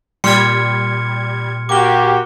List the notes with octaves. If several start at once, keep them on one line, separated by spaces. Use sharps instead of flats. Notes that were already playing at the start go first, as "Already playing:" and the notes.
A#2 G3 C6 F6 G#6 C#7
A#3 F#4 G4 D6 G7